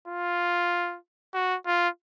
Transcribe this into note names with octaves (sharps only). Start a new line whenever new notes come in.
F4
F#4
F4